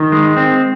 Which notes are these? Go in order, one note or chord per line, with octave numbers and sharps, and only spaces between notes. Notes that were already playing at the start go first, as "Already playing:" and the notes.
Already playing: D#3
G#3
C4